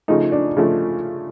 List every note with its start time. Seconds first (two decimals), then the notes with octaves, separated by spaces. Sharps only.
0.08 C#3 F3 A3 D#4
0.32 D4
0.57 C#3 F3 A3